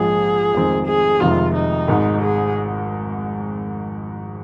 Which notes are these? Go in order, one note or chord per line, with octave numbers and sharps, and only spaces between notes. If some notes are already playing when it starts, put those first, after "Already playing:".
Already playing: A#1 G#2 F3 G#4
F1 F2 D#3 G#3 C4
G#4
F1 F2 C3 D#3 G#3 F4
D#4
G#1 G#2 D#3 G#3
G#4